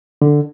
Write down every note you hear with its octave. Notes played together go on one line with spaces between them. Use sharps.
D3